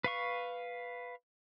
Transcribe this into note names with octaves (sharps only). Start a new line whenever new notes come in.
B4 F5 C#6